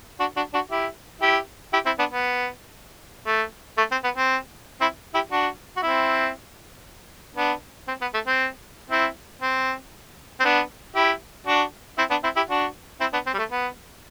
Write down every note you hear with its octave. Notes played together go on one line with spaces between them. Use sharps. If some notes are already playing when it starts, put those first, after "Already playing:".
D4 F#4
D4 F#4
D4 F#4
E4 G4
E4 G4
E4 G4
C4 E4
B3 D4
B3
A3
A3
C4
B3
C4
C4 E4
E4 G4
D4 F#4
F#4
C4 E4
B3 D4
C4
B3
A3
C4
C4 E4
C4
C4
B3 D4
E4 G4
D4 F#4
C4 E4
B3 D4
C4 E4
E4 G4
D4 F#4
C4 E4
B3 D4
C4
G3
A3
B3